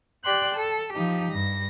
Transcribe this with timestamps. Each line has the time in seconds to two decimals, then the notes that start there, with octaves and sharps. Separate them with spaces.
0.24 G4 D5 G5 C6 F#6
0.56 A4
0.93 F3 D#4 G4
1.32 G2 A#6